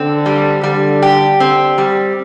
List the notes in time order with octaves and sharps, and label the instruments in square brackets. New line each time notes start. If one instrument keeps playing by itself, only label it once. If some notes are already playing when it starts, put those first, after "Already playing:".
Already playing: [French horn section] D3 [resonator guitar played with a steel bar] C4
[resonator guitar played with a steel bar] G3
[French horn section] D3 [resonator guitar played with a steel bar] G3
[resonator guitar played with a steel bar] G4
[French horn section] D3 [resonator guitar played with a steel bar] C4
[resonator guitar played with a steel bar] G3